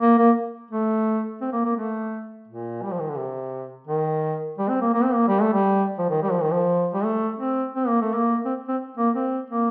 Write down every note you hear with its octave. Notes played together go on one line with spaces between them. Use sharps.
A#3
A#3
A3
C4
A#3
A#3
A3
A#2
G3
F3
D#3
D3
C3
D#3
G3
C4
A#3
A#3
C4
A#3
G3
A3
G3
F3
D#3
G3
F3
D#3
F3
G3
A3
C4
C4
A#3
A3
A#3
C4
C4
A#3
C4
A#3